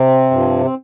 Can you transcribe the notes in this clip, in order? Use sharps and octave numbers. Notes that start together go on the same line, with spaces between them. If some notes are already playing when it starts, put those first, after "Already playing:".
Already playing: C3 C4
G2 F3
C4